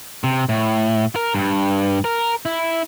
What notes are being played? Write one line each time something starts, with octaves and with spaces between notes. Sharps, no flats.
C3
A2
A#4
G2
A#4
E4